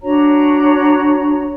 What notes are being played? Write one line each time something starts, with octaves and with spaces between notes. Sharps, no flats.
D4 F#4 C#5 A#5